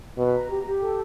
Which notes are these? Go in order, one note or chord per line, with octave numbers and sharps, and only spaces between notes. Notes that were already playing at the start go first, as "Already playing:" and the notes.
B2 B4
A#5
G4
G4
A4